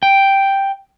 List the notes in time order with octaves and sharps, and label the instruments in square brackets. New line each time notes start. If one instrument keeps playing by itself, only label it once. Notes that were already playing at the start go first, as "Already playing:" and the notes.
[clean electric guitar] G5